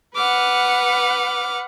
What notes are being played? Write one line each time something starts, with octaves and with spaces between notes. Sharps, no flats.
B4 F#5 D6 F6